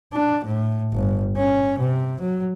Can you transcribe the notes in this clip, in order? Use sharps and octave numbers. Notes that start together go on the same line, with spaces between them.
D4
A2
G1
C#4
C3
F#3